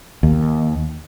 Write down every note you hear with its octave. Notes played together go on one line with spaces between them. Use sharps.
D#2